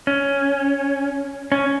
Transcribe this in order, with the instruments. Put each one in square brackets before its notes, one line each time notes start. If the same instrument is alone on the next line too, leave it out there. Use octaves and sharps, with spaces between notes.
[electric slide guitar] C#4
C#4